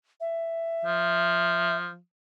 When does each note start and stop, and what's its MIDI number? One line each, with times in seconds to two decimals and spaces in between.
0.20 1.77 76
0.85 1.97 53